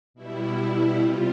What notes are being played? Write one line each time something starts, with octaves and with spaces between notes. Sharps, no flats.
B2 G3 E4
E4
C3 G3 F4